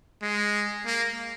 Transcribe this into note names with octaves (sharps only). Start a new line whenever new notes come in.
G#3
A#3